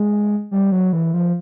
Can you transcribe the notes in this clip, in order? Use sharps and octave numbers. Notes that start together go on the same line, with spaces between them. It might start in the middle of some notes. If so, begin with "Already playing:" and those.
Already playing: G#3
G3
F#3
E3
F3